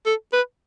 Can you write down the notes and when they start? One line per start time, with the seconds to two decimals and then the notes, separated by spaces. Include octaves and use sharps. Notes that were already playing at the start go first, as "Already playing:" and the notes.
0.06 A4
0.33 B4